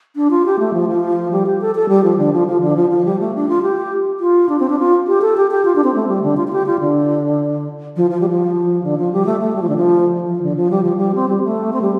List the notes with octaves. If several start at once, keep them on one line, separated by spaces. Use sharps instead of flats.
D4
F4
G4
A3
F3
F3
G3
G4
A4
A4
G3
F3
D3
F3
F3
D3
F3
F3
G3
A3
D4
F4
G4
F4
D4
C4
D4
F4
G4
A4
G4
G4
F4
D4
C4
A3
G3
D3
F4
F4
G4
F4
D3
F3
F3
G3
F3
D3
F3
G3
A3
A3
G3
F3
D3
F3
F3
D3
F3
G3
F3
G3
C4
G3
A3
C4
G3